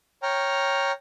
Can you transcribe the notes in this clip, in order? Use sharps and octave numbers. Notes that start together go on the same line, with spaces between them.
C#5 G5 A#5 F6